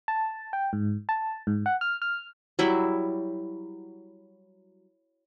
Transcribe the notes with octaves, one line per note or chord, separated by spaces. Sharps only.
A5
G5
G#2
A5
G#2
F#5
F6
F6
F#3 G3 E4